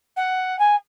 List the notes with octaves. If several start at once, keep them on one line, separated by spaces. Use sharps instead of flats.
F#5
G#5